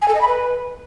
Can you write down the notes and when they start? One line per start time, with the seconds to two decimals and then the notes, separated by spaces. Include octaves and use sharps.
0.02 G#5
0.08 A4
0.15 D#5
0.21 B5
0.27 B4